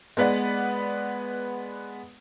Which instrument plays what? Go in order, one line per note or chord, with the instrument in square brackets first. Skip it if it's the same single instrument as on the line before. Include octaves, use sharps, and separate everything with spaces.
[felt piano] G#3 B3 B4 D5 F#5